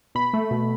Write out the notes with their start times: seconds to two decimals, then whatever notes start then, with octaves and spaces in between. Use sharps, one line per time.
0.15 B2 B5
0.34 A3
0.51 B2